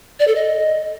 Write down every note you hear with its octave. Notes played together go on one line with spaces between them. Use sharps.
D5
A4
D#5